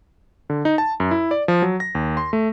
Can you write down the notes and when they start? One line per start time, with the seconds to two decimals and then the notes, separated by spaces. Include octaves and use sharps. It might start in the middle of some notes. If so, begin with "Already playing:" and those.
0.50 D3
0.65 D#4
0.78 A5
1.00 F#2
1.11 E4
1.31 D5
1.48 F3
1.62 F#3
1.80 A#6
1.95 D#2
2.17 C6
2.33 A3